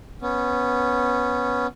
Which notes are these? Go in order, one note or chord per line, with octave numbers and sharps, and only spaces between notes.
B3 C#4